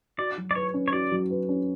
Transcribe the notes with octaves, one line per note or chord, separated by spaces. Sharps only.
F#4 D5
F#3
D5
B4 C#5
C#4
C#5
F#4 D5
F#3
B4
C#4